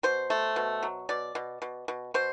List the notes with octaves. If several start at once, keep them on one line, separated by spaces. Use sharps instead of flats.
B2 C5
A3
B2
F#3
B2 D5
B2
B2
B2
B2 C5